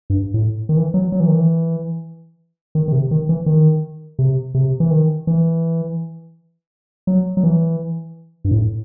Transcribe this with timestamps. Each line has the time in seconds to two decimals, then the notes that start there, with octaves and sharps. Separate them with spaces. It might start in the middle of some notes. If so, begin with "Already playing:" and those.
0.10 G2
0.34 A2
0.69 D#3
0.77 E3
0.94 F#3
1.12 F#3
1.20 E3
1.28 D#3
1.34 E3
2.75 D#3
2.88 D#3
2.92 C3
3.11 D#3
3.29 E3
3.46 D#3
4.19 C3
4.55 C3
4.80 E3
4.91 D#3
5.27 E3
7.07 F#3
7.37 F#3
7.43 E3
8.45 G2
8.51 A2